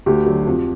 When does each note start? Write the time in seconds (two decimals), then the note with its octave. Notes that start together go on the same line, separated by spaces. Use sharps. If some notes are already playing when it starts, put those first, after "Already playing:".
0.06 D2 G4
0.26 D3 F#3
0.47 F2